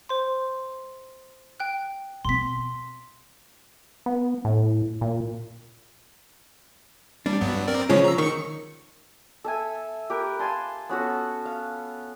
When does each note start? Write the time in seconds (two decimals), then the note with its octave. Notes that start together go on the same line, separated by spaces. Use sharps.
0.09 C5 C6
1.60 G5 F#6
2.25 B2 C4 C6 B6
4.06 B3
4.45 A2
5.01 A#2
7.26 G3 D4
7.41 G2 F#3 B3
7.68 C4 A#4 D5
7.90 C#3 F3 F#3 G#3 C#4 C#5
8.04 A#5 E6
8.18 D#3 C#6 C#7
9.44 A4 E5 G#5
10.10 G4 A#4 B4
10.39 F5 G#5 A5 C6
10.89 B3 C#4 F#4 A4
11.45 F5